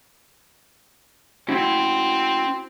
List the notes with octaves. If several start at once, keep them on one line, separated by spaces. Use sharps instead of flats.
C4 C#4 E4 F#4